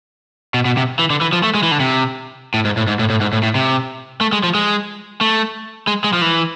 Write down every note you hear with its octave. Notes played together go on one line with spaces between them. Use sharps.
B2
B2
C3
E3
D3
E3
F3
A3
G#3
E3
D3
C3
A2
G#2
A2
G#2
A2
A2
G#2
A2
A2
C3
A3
G#3
F3
G#3
A3
G#3
G#3
F3
E3